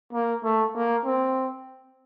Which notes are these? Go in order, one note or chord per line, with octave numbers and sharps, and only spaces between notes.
A#3
A3
A#3
C4